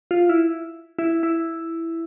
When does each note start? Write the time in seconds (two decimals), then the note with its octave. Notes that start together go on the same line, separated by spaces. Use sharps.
0.11 F4
0.29 E4
0.99 E4
1.23 E4